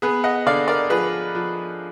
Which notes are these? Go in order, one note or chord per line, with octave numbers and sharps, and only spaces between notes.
B3 G#4 B4
D#5 F#5
D3 D5 F5
A#4 D5
F3 G#4 B4
F3